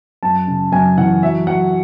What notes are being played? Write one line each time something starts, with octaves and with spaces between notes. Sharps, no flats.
F#2 A5
C#3
F#2 G#5
E3 F#5
F#3 E5
F#3 F#5